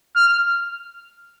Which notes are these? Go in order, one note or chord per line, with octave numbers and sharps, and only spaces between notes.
F6